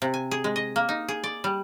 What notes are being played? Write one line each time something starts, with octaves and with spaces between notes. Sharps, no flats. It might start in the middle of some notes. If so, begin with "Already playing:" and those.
C3
G#5
G#4
G#3
D#5
A#3
D#4
G#4
D5
G3